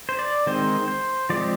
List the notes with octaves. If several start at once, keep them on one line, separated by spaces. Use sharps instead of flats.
C5
D5
D#3 G#3 C4 C5
C5
F3 G#3 C4 D5